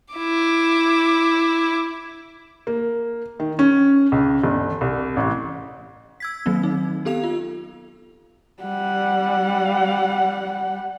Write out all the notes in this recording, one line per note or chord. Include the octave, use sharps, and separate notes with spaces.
E4 D6
A#3
D#3
C#4
C#2
G1
C2
A1
E6 G#6 B6
D#3 F#3 A#3 C4
D#4
B3 G4 A4 F5 F7
F4
G3 F#5